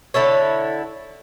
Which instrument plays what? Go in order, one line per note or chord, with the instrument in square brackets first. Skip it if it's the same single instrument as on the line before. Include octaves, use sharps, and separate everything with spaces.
[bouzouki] D3 E4 A4 C#5